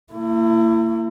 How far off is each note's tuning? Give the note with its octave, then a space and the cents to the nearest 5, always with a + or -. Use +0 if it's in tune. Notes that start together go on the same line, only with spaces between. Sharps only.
A#3 -35 E4 +30